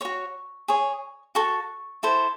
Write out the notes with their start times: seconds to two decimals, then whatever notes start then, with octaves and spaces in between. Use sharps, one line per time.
0.01 F#4 C#5 C#6
0.68 G#4 C#5
1.35 F#4 A4 C#6
2.03 E4 A4 C5